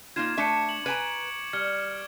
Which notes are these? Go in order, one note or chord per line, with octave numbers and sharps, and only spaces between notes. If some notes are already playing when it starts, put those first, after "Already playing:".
A#3 D#4 F4 G#6 E7
A3 D4 E5 C#6 D6 C#7
F#7
B4 G#5 A#5 G#6 D7 F#7
G3 F6 G#6 C#7